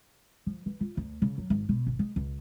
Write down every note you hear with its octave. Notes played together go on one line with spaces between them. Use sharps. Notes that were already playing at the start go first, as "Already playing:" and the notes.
F3
E3
F4
D2
C#3
F#3
G#1
B2
G#1
G#3
C#2